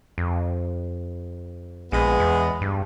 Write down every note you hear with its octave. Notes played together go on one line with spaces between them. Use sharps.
F2
A#1 G#3 B3
E2
G2